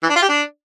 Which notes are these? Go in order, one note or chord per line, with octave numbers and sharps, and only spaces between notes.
E3
D4
F4
G4
D4